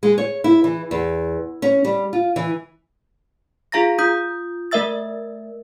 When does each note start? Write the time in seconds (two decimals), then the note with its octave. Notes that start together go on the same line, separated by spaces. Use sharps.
0.03 G#3
0.18 C#5
0.44 E4
0.64 E3
0.91 E2
1.62 C#4
1.85 G3
2.13 F4
2.36 E3
3.72 F4 G#4 F5 A#5 A6 A#6
3.98 F4 D#6 G6
4.71 A3 A#4 D#5 E5 E6 A6